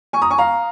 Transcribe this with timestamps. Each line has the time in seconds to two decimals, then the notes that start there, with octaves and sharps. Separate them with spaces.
0.13 G#5 C#6
0.22 A#5 D#6
0.31 G#5 C#6
0.38 F5 A#5